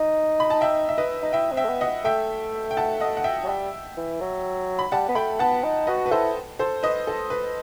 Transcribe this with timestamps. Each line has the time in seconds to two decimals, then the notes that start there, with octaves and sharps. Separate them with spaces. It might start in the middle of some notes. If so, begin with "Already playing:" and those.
Already playing: D#4
0.40 B5
0.50 A5
0.61 E5 G5
0.89 E5
0.98 B4 D#5
1.22 D#4
1.33 E4 E5 G5
1.51 C4
1.57 E5 G5
1.64 A3
1.69 B3
1.81 D#5 F#5
2.05 A3 E5 G5
2.71 G5
2.77 F#5 A5
3.00 D#5 F#5
3.17 F#5
3.24 E5 G5
3.44 F#3
3.48 G3
3.97 E3
4.21 F#3
4.79 B5
4.92 G3 F#5 A5
5.08 B3
5.15 A3 G5 B5
5.39 B3 F#5 A5
5.64 D#4
5.87 F#4 B4 D#5
6.06 B4
6.11 E4 A4 C5
6.59 A4 C5
6.83 B4 D#5
7.07 A4
7.30 B4